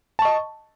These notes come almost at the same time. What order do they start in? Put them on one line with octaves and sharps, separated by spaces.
A5 C#6 D#5